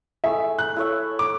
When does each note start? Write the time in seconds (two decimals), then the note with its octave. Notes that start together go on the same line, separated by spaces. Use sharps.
0.24 A3 E4 G#4 E5
0.59 F#6
0.76 E4 A4 C#5 E5
1.19 D6